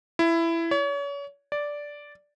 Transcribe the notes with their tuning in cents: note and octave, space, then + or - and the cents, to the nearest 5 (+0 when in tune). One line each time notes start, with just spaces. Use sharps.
E4 +15
C#5 +35
D5 -5